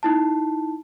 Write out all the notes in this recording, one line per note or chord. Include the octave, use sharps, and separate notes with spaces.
D#4 E4 A5